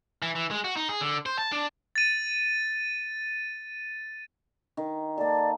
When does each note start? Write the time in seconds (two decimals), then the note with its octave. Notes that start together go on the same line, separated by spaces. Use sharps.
0.22 E3
0.35 E3
0.51 G#3
0.64 F#4
0.76 D#4
0.89 G#4
1.01 D3
1.26 C5
1.38 A5
1.52 D4
1.96 A6 D#7
4.77 D#3
5.18 A#3 A4 D5